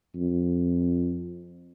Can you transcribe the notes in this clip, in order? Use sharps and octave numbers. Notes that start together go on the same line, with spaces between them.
F2